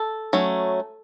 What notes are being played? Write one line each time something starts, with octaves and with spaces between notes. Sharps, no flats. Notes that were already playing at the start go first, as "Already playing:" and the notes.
Already playing: A4
F#3 A3 C#4